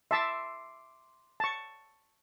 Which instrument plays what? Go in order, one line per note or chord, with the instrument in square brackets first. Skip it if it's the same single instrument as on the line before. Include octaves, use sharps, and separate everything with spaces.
[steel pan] E5 A5 E6 [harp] C6 D6 C7
[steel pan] A5 C#6